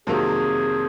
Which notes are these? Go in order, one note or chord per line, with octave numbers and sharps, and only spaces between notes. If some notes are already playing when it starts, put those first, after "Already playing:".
F2 C3 D#3 F#3 A#3 G#4